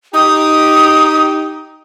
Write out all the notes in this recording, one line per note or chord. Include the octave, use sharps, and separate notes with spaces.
D#4 G4 D#6